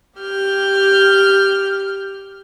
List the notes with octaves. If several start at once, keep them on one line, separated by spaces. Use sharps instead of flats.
G4 F6 G6